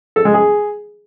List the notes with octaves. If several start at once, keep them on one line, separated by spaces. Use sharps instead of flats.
A4
G#3
G#4